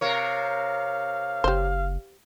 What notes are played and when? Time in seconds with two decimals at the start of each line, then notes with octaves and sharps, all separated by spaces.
0.01 C3 A#4 C#5 F5
1.44 F#1 G4 C5